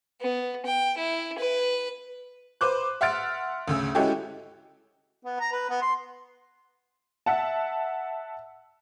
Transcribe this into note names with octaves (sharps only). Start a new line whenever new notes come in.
B3
G5
E4
B4
B4 C5 D6 F#6
E5 F#5 C6 F6 A6 D7
D2 C#3 E6
G#3 C#4 E4 F#4 G4 A4
B3
A#5
B4
B3
C6
E5 F#5 A5